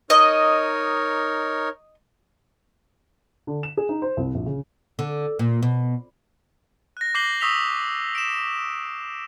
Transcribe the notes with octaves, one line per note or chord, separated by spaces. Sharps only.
D#4 A#4 C#5 D#5
D3
E7
G#4
D#4
C5
C2
A#1
C#3
D3
A#2
B2
F#6 A#6
D6 G6 A#6 C7 F#7 G7
C#6 D#6 E6 B6 F7 G7
D7 E7